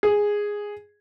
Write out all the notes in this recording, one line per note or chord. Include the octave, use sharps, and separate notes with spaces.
G#4